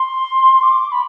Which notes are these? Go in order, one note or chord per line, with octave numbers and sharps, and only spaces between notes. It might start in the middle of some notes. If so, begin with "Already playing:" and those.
Already playing: C6
D6
B5